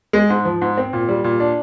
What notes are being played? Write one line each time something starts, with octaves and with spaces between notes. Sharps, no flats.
G#3
G#2
F3
G#2
C4
A#2
G3
A#2
D4